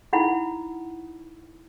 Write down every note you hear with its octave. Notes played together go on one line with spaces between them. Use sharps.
D#4 E4 F#5 B5